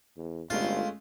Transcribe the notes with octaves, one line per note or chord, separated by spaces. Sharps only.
E2
G1 G#3 A3 C#4 F4